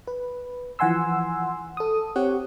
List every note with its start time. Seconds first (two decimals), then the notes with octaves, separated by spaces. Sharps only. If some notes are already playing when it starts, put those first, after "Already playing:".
0.07 B4
0.79 E3 F3 F#5 G#5 C6 E6
1.77 A4 D#6
2.16 C4 G4 C#5 F#5